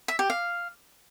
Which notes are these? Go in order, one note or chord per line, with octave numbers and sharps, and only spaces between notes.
E5
G4
F5